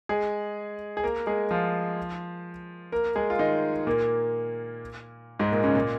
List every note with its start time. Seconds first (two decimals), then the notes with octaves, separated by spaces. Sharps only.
0.09 G#3 G#4
0.97 G#4
1.03 A#3 A#4
1.27 G#3 G#4
1.51 F3 F4
2.92 A#3 A#4
3.16 G#3 G#4
3.30 F4
3.39 D#3 D#4
3.87 A#2 A#3
5.40 G#2 G#3
5.51 A#2 A#3
5.64 C#3 C#4
5.75 A#2 A#3